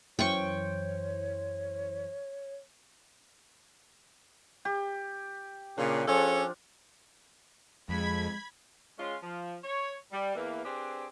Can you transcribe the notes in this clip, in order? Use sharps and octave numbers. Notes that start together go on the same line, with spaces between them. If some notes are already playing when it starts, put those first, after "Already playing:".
F#2 E3 C5 C#5 G5 C#6
G4
A#2 C#3 D4
F3 C#4 G#4 A4
F2 G#3 B5 G#6
G#3 C#4 F4
F3
C#5
G3
E2 E3 A#3
C4 D4 G4 G#4 B4 C5